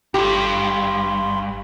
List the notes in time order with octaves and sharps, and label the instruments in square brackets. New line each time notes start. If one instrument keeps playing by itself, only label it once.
[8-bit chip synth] G#1 B5 C6 [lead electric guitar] D2 G2 [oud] G4